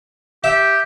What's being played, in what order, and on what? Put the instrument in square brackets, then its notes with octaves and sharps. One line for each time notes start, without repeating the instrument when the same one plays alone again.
[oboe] G4 [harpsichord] E5